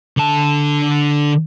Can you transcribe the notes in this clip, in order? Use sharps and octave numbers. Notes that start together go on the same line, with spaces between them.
D3 A5